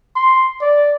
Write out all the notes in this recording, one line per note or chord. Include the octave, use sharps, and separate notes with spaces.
C6
D5